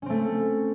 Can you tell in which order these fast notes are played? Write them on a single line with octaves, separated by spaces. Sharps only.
C#4 C4 A3